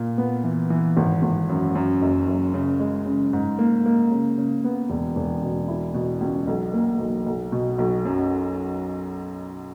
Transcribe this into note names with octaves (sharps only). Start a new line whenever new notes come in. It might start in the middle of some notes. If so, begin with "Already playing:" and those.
Already playing: A#2
B3
E3
E3
G#1
G#1
F#2
F#2
F#1
F#1
C#3
G#3
C#3
G#2
A#3
A#3
C#3
C#3
B3
E1
E1
B2
E4
B2
C#2
B1
A#3
B1
B1
B2
B1
F#2